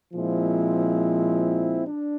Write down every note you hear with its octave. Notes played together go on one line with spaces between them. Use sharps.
A#2 F3 G#3 C4 E4
D4